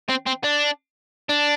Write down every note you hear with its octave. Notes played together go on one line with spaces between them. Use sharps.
C4
C4
D4
D4